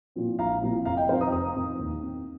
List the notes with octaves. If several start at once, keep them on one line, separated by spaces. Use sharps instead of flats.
A#2 F3 C4
A#1 F5 A#5
A#2 F3 C4
F1 F5 A#5
D#5 G5
F2 D#3 C4 C5 F5
A#5 D#6
F1 A#5 D#6
F2 D#3 C4
D#2
D#3 C4